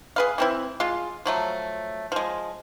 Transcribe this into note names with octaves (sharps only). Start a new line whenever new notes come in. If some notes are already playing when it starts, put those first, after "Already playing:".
G#4 B4 F5
E3 C4 E4
G#3 F4
F3 F#3 A3
F3 G#3